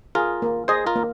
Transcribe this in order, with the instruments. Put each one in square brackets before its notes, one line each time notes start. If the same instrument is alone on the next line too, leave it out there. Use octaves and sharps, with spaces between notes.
[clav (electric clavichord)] F4 A#4 [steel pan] G#4
[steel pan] A#3
[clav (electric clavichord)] G#4 C5 [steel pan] D#5
[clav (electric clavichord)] F4 A#4
[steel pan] A#3